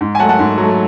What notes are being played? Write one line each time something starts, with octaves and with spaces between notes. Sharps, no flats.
G#2
G#5
F#3 A3 F#5 A5
F#5 A5
G#2
F#3
A3